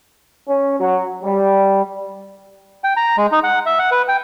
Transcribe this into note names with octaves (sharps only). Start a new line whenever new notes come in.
C#4
F#3
G3
G5
A#5
G#3
D#4
F#5
E5
F#5
B4
G5